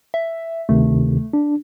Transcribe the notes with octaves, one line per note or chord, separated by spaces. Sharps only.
E5
D2 C3 D#3 A3
D4